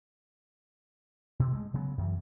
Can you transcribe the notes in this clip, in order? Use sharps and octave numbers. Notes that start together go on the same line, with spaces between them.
B2
G#3 A3
C#3 F#3 B3
F#2 E3